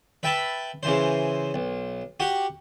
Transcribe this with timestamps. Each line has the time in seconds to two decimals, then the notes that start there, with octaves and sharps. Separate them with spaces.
0.23 B4 E5 G5 A5 B5
0.83 C#3 E3 C5
1.54 B1
2.20 F#4 G4 F#5